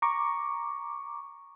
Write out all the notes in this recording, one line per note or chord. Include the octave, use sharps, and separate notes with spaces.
A#5 C#6 D6